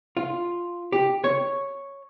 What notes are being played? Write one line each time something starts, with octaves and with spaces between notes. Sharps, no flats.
F4
G4
C#5